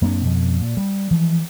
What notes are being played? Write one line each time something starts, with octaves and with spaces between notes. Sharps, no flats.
F#2 A#3 C4 D4
F2 B2
A#2
G3
E3 F3 G#3